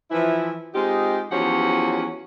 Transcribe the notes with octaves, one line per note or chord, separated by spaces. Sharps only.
E3 F3 E4
G#3 C4 D#4 F4 G4
E2 F3 F#3 C#4 G4 F#5